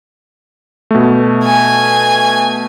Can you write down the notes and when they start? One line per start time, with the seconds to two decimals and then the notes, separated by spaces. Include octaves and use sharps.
0.91 B2 A3
1.44 G#5